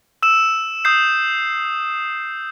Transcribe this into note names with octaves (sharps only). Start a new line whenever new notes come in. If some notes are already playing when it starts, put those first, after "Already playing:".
E6 E7
D#6 E6 G6 C7